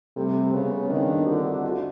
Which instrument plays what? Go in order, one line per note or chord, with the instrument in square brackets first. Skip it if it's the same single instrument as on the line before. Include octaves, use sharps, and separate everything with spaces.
[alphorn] C3 [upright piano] G3 A3
[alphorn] C#3 [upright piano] B3 C#4
[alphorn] D#3 [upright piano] C4 D4
[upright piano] C4 D4
[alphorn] D3 [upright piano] F4 G4
[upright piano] E4 F#4
D#4 F4